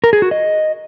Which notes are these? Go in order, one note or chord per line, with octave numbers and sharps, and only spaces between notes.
A#4
G#4
F#4
D#5